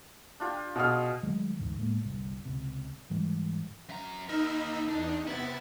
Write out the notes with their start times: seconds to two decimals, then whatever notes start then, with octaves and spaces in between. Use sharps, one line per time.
0.40 D4 F4 G4
0.76 B2 G#4 D#5 F5 F6
1.23 D#3 F#3 G#3 A3
1.59 G1 D2 G#2 E3
1.78 A2 G#3 A#3 B3
2.04 G1 C2 G2
2.45 C#2 C3
3.10 G#2 E3 G3 G#3
3.89 F#2 A#5
4.29 D#2 D#4 A#4 B5 E6
4.88 E2 D4 D#4
5.27 C3 B3 E4 A6